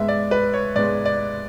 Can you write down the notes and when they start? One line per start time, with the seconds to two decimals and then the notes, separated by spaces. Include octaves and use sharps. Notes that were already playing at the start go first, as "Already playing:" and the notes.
Already playing: G#2 G#3 B3 E5
0.08 D5
0.31 B4
0.54 C#5
0.76 G#2 G#3 B3 D5
1.05 D5